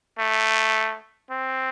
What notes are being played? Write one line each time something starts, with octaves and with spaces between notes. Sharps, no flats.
A3
C4